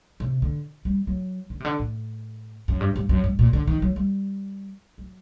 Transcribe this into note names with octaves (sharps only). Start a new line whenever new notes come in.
C3
D3
G3
F#3
D3
C3
D3
A2
F#2
G2
G2
F#2
G2
A#2
D3
D#3
F#3
G3
F#3